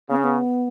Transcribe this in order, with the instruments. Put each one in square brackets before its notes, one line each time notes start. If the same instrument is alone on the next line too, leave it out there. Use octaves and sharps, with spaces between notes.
[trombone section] C#3 [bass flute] B3
[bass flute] C#4
B3